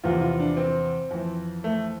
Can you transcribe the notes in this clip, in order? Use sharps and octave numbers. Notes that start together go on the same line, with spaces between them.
E2 C3 F3 F4
F4
D4
C4
F2 E3
A3